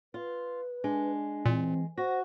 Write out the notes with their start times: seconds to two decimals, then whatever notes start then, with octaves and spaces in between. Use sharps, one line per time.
0.14 F4 B4
0.84 G#3 D4
1.46 A#2 E3 C4
1.98 F#4 C5 A#6